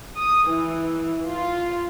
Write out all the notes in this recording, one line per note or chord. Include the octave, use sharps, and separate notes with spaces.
D#6
E3
F4